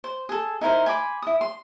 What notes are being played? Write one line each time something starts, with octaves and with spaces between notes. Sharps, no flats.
C5
G#4 A4
D#4 E4 A#4 C5
G#5 B5 C6 D6
E4 D#6
C6